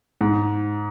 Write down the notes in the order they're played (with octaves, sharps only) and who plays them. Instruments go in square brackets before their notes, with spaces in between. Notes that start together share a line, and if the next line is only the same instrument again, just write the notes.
[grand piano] G#2